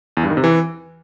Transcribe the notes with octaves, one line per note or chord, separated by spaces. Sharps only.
E2
G2
D#3
C3
E3